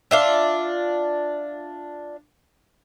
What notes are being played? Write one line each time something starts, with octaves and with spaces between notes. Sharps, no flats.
D4 F4 E5